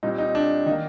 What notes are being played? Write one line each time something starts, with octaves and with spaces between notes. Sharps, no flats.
A#2 G3 C4 D#4
D#4
D4
D#3 A#3 D#4